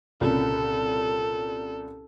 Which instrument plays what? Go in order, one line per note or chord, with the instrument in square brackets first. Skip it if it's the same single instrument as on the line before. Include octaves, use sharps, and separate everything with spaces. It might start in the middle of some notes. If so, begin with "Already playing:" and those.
[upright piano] C2 A#2 C#3 [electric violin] A4